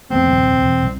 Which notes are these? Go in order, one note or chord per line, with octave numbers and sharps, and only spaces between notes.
F2 A3 B3 C4
D#1 C2 F2
E1
C2